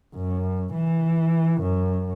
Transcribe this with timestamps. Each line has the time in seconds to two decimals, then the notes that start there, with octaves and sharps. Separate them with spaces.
0.15 F#2
0.73 E3
1.61 F#2